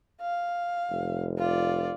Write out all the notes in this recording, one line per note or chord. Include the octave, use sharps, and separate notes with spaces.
F5
F1
F4 D5